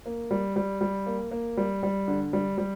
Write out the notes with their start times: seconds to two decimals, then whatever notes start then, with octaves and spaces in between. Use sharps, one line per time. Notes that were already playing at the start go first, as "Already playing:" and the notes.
0.06 A#3
0.31 G3
0.56 G3
0.81 G3
1.06 A#3
1.31 A#3
1.57 G3
1.83 G3
2.08 D3
2.33 G3
2.58 G3